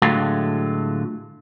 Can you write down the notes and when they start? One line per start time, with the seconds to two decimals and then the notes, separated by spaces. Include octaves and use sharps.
0.02 A2 D3 F#3 G#3 A3 F4